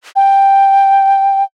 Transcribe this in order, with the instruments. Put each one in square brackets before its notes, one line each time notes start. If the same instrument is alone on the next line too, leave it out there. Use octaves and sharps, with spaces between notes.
[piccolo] G5